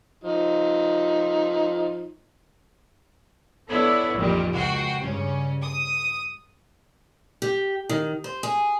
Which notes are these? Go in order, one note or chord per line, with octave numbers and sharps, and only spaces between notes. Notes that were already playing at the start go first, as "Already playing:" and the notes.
F3 D#4
B3 D4 E4 A4 C#5
A1 F2 A#2 D#3 G3
C#2 F#4 G5 C7
G2 C#3 C#4
D#6
G4
D#3
C5
G#4